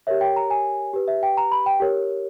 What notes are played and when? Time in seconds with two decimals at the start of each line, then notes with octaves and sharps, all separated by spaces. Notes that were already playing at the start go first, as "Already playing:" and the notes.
0.07 G4 A#4 C#5 E5
0.21 G5
0.36 A#5
0.50 G#5
0.94 G4 B4
1.08 E5
1.23 G5
1.37 A#5
1.52 B5
1.66 G5
1.80 G4 A#4 C#5